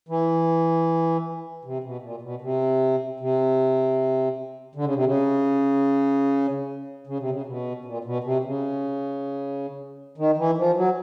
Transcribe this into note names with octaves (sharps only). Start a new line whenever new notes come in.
E3
C3
B2
A#2
B2
C3
C3
D3
C#3
C3
C#3
C#3
C3
C#3
C3
B2
A#2
B2
C3
C#3
D#3
E3
F3
F#3